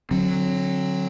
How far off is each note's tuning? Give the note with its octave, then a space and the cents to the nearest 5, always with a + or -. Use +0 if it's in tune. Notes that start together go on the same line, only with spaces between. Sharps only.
D3 +0 F#3 -10 C4 +25